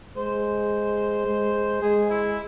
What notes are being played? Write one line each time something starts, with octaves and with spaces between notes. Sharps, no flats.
G#3 C5
G#3
G#3 G#4
E4